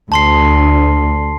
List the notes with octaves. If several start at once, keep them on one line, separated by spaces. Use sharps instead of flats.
D2 A5 C6 C7